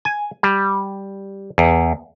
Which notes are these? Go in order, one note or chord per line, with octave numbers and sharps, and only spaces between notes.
G#5
G3
E2